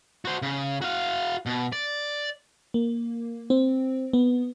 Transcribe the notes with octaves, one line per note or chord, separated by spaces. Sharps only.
F#4 C5
C#3
F#4 F5
B2
D5
A#3
C4
B3